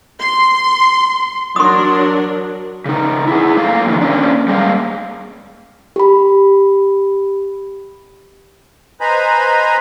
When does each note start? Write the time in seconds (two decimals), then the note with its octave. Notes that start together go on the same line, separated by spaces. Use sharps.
0.21 C6
1.56 F#3 D4 A#4 C6 D#6
2.85 C#3 D#4
3.27 E4 G#4
3.57 A3 A#3 F#4 F5
3.87 F2 A2 D3 D#3
4.01 A#3 C#4 D4
4.48 G3 G#3 A#3 F5
5.96 G4 B5
9.01 B4 C5 D#5 G#5 A#5 B5